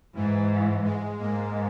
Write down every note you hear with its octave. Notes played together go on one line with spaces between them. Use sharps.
G#2 E3
G#3
G#2 A#3